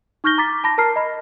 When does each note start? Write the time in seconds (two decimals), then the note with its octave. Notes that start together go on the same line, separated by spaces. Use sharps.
0.24 D#4 C#6 F6 G6 A#6 G7
0.38 A#5 D6 A6 B6
0.64 A5 B5 A#6
0.78 A#4 A5 A#5 F6 C7
0.96 D#5 B5